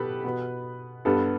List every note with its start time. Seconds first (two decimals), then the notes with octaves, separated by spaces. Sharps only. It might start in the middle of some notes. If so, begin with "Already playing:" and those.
Already playing: B2 G4 A4 B4
0.24 B2 B3
1.05 G2 G3 B3 A4